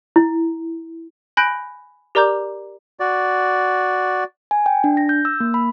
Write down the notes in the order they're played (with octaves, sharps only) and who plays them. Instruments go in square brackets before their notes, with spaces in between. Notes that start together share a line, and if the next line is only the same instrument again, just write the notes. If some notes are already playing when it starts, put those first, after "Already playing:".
[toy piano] E4
[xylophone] G#5 B5 F#6 G6 A#6 D7
G4 A#4 D5 A#5 D6 G6
[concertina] F#4 D5
[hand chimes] G#5
G5
D4
A#6
G6
E6
A#3
B5